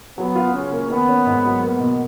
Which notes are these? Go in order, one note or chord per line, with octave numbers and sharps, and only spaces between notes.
F#3 B3
F4
C#3 C#4
A#3
D#3 B3
C#4
G#2
F#3
A#3 B3
B2